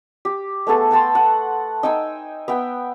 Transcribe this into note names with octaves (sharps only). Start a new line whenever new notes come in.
G4
A3 B3 G#4 A4
F#5 G5 A5 C6
F#5
D#4 G5 G#5 E6
B3 E5 G5